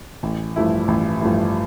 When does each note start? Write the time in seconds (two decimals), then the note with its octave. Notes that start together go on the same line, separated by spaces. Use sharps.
0.23 A1
0.56 G2 F3 A3 E4
0.88 A1
1.21 G2 F3 A3 E4